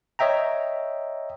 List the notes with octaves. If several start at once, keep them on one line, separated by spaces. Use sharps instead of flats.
C#5 D#5 E5 G5 A#5